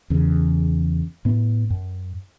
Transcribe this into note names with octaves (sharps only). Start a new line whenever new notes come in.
E2 C#3
A2 B3
F#2